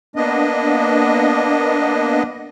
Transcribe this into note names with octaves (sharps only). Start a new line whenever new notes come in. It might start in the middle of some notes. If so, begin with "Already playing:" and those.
A#3 B3 D4 D#5